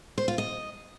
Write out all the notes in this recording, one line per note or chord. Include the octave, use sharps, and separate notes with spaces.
C5
F4
D#5